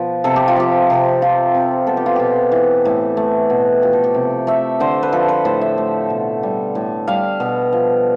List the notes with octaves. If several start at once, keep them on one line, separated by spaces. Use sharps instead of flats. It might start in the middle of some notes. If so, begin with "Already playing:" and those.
Already playing: B2 F3 B4
C3 A4
G4
F4
F3 G4
C3
F3 F4
C3
B3 A4
G4
F4
B2 G4
E3
A2
A3
B2
F3 G4
A4
G4
C3
A3 E5
D3 C5
B4
F3 A4
B4
A2 C5
E5
A3
B2
G3
A2
G3 F5
B2
F3